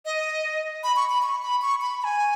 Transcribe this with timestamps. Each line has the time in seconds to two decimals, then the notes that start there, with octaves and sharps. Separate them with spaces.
0.05 D#5
0.84 B5
0.96 C#6
1.10 B5
1.22 C#6
1.43 B5
1.62 C#6
1.81 B5
2.00 B5
2.04 G#5